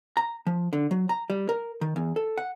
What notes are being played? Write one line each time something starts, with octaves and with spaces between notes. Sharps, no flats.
A#5
F3
D3
F#3
A#5
G3
A#4
D#3
E2
A4
F#5